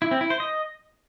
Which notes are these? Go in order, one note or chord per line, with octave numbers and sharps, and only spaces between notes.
E4
C4
E4
C5
D#5